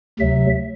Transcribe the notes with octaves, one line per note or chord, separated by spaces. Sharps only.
D2 C3 F#3 E5